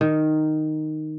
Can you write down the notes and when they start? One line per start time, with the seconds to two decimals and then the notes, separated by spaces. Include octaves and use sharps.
0.01 D#3